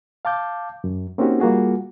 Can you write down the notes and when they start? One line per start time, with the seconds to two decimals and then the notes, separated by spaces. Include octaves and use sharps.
0.25 F5 A5 D6 G6
0.84 F#2
1.18 A#3 C4 C#4 D#4 F#4 G4
1.40 G3 A#3 F4 F#4 G#4